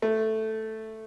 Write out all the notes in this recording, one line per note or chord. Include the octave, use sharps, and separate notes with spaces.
A3